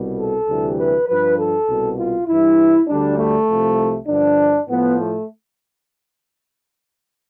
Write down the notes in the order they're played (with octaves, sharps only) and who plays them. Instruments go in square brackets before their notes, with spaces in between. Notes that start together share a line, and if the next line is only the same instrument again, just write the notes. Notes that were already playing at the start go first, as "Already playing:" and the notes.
Already playing: [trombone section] C2 B2 G3
A4
D2 C3 E3 G3
B4
G2 F3 B4
A4
C2 B2 G3
F4
G2 E3 G3 E4
D2 D3 G3 D4
A3
C2 C3 F3
G2 D3 F3 D4
A2 F3 B3
A3